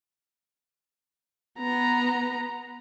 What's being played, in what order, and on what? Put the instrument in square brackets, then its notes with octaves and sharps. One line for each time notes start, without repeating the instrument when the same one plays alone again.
[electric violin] B3 A#5